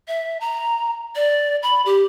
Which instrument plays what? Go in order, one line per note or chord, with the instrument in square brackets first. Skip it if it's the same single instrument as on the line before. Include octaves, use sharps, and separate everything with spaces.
[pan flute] E5
A#5
D5
B5
G4